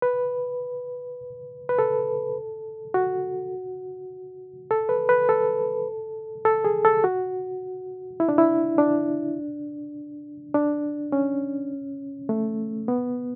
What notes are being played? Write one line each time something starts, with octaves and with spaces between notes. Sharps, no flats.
B4
B4
A4
F#4
A4
B4
B4
A4
A4
G#4
A4
F#4
E4
D4
E4
D4
D4
C#4
A3
B3